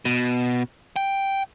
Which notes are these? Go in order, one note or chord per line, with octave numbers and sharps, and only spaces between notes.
B2
G5